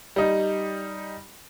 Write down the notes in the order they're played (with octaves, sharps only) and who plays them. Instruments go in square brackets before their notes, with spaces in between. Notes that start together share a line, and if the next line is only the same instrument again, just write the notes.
[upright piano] G3 D#4